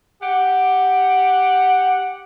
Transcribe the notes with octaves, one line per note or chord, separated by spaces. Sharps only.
G4 F#5